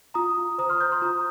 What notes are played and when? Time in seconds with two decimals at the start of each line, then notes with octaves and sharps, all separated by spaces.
0.14 F4 A#5 D#6
0.37 F4
0.58 C5 A#5 D#6
0.70 C6 F6
0.80 C5 D#6 G6
0.92 C6 F6
1.02 F4 A#5 D#6